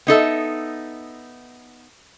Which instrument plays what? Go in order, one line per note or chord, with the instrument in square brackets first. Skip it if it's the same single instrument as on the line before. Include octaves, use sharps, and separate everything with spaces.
[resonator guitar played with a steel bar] B3 D#4 A4 E5